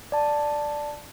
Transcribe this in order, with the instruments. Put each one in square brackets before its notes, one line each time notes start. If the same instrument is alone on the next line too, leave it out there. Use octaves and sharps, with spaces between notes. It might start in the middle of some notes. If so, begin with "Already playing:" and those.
[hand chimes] D5 A5